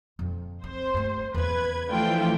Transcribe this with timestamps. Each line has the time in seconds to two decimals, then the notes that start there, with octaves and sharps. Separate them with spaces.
0.19 F2
0.64 C4 C5
0.94 G2 A3
1.34 E2 C#3 B4 G#6
1.88 E3 F3 A3 D4 F4 G5